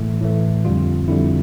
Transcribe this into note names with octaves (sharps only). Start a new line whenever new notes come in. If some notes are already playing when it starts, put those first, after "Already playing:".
Already playing: A2 E3 A3
A2 E3 A3
F2 D3 G3 F4
F2 D3 G3 E4